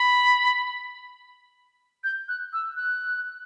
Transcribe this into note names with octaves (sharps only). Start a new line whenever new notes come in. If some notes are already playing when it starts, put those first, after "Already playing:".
Already playing: B5
G6
F#6
E6
F#6